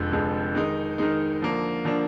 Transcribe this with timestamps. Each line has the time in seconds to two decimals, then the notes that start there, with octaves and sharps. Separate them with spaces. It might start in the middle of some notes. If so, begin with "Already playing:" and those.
Already playing: F1 F2 D3 G#3
0.12 F1 F2 D3 G#3
0.55 D#3 G#3 D#4
0.98 D#3 G#3 D#4
1.41 D3 F3 A#3 D4
1.84 D3 F3 A#3 D4